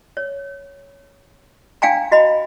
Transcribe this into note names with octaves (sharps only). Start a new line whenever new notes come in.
C#5
D4 F5 G5 G#5 A#5
F#4 D#5 A#5 B5